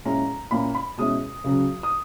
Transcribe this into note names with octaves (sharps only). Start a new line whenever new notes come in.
A#2 G#3 C#4 E4 A#5
A#2 A#3 C#4 E4 B5
B5
B2 G#3 C#4 E4 D#6
C#2 C#3 F#3
D#6